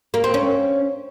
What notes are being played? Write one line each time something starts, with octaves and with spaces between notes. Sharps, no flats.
A#3
C4
C#4